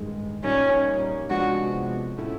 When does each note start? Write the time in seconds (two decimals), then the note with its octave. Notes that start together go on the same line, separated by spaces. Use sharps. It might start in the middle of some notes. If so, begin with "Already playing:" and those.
Already playing: A1 G2 D#3 G#3
0.43 A#1 A#2 G3 A#3 C#4 D#4
1.29 C3 F3 G#3 B3 D4 F#4
2.17 A2 F3 A3 C#4 E4